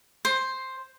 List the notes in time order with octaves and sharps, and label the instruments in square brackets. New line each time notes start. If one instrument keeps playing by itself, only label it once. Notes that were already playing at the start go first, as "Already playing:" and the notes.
[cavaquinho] C5